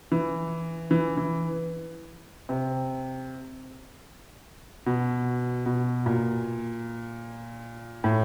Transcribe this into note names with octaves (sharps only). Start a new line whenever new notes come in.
E3
E3
E3
C3
B2
B2
A#2
A2